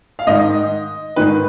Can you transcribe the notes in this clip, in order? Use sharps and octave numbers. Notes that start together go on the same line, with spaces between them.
F5
G#2 D#3 D#5
G#2 D#3 B4